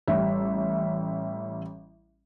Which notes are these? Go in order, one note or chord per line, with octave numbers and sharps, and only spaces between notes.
A1 G3 E5